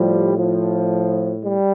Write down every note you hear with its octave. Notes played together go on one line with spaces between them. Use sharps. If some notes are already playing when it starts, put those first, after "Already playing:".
Already playing: A2 F3 G3
F3
G3